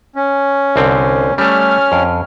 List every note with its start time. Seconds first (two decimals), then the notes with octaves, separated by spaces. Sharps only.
0.16 C#4
0.76 C2 D3 C4
1.38 G3 A3 C#4 F6
1.92 F2